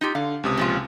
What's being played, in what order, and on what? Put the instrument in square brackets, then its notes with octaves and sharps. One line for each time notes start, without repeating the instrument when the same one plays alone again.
[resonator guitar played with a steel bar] D#4 F4 G4
[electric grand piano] D3 [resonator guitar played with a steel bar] F5
[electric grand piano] C#2 C3 D#6
[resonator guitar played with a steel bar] A#2 F3 F4